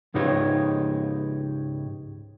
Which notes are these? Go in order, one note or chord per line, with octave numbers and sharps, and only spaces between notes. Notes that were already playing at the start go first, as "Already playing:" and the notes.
C#2 G#2 D#4 G4 B4 C#5